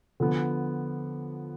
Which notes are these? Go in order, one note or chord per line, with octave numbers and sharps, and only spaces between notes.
D3 F3 B3